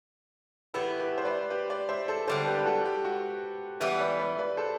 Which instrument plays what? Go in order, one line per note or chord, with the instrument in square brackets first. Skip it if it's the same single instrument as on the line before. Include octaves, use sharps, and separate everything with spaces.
[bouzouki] A2 E3 B3 E4 [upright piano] G4
[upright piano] G4 B4
C5
B4 D5
G4 B4
B4 D5
C5 E5
A4 C5
[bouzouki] D3 G3 B3 [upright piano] A4 C5
[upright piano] G4 B4
B4
F#4 A4
G4
F#4
[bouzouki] E3 G3 B3 [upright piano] G4 B4
[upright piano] B4 D5
B4 D5
B4 D5
A4 C5